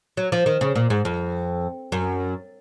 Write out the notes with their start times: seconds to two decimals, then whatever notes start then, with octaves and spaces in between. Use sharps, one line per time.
0.17 F#3
0.32 F3
0.46 D#3
0.61 C#3
0.75 A#2
0.90 G#2
1.05 F2
1.92 F#2